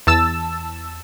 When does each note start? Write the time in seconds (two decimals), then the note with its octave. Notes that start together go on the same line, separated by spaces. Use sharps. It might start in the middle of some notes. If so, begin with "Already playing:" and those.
0.07 E2 A5 E6